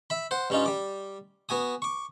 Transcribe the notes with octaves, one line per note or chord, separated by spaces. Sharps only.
E5 B5
C5 F#5
G2 C#4 D#4 F4
G3 D6
B3 F#4 G#5 D#6
C#6 D6